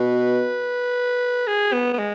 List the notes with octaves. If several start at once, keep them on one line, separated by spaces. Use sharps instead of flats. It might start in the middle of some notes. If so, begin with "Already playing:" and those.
Already playing: B2 B4
G#4
B3
B3
G#3